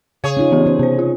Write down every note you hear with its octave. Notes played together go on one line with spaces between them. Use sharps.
C#3 G#4 C#5 F5
C#4 D#4 F4
E3 B3 G4
C#4 C5
C3 B3 C5
F4